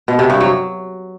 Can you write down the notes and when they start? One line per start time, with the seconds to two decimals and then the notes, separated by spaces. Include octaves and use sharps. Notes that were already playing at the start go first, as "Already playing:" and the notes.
0.08 B2
0.19 C3
0.30 G2
0.40 F#3